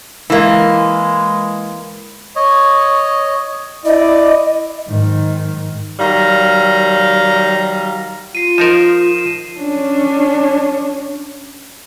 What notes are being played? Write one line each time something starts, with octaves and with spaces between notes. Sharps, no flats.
E3 G#3 A#3
C#5 D#5
E4 D5 D#5
G#2 D#3
D#3 F#3 G3 F5 A#5
F4 C7 D#7
F3 D#4 A#4 E7
D#7
C#4 D4